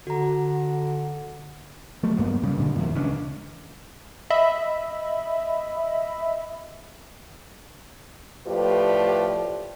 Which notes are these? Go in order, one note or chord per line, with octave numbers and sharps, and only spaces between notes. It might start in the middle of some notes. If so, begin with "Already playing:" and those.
D3 F#4 A#5
F#3 A3
G2 A#3 B3
G2 C#3 G3
A#2 D3
F2 D#3 E3
C#2 C#4 D4
D#5 E5 B5
A2 F3 G4 B4 D5